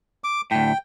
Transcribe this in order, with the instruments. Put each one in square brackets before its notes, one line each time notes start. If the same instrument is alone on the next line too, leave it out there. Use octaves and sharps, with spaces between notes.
[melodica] D6
[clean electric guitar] D2 A2 [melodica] G5